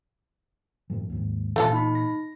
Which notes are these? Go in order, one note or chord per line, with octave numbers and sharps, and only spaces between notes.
F#2 A2 F3
D#2 G#2
A#2 E3 A3 F4 A4
D#4 B5
A#6